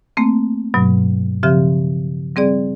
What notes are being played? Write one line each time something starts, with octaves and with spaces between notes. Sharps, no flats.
A3 A#3 C4
G2 B2 F#3
C#3 F3 C4 G4 E5
G3 C4 G#4 D5